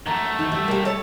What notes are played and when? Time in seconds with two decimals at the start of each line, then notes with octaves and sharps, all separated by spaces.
0.06 F#2 A3 A#5
0.39 D2 D#4
0.52 G3 E5
0.68 A#3 G4
0.85 A3 C#5 A5